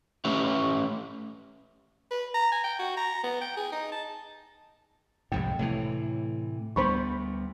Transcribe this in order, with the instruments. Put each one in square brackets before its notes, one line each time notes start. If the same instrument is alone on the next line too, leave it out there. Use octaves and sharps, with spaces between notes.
[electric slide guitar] A3 C#4 G4 B4 C#5 E5
[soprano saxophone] B4
A#5
G#5
G5
F#4
A#5
B3
G5
G#4
D#4
A5
[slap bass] C2 F2 G#2 [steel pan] G5
[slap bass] A2 C3 E3
[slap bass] D2 G3 B3 [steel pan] C5 B5 C#6